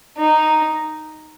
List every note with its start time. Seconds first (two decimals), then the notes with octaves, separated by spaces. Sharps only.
0.18 D#4